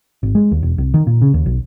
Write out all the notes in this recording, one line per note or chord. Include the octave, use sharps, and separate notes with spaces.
G#1
G#3
D#2
E1
C2
D#3
A#2
C#3
D#2
B1